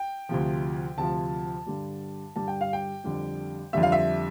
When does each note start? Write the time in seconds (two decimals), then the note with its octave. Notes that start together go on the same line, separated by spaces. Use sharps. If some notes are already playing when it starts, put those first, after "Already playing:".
Already playing: G5
0.29 D2 C3 F3
0.98 D2 C3 F3 A5
1.66 G2 D3 G3
2.36 G2 D3 G3 A5
2.48 G5
2.61 F5
2.73 G5
3.04 F2 D3 G3
3.73 F2 D3 G3 E5
3.83 F5
3.92 E5